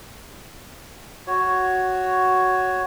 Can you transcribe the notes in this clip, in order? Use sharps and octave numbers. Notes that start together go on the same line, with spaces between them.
F#4 C#5